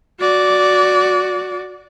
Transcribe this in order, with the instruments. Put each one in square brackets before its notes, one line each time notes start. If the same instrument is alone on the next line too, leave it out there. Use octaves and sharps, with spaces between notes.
[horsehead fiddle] F#4 D5